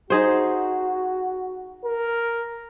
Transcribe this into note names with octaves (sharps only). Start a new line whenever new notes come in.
D#4 F#4 G#4 C5
A#4